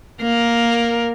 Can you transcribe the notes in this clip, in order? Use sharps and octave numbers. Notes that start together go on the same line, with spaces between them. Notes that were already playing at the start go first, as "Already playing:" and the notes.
A#3 A#4